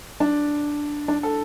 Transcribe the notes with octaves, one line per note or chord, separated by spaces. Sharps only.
D4
D4
A4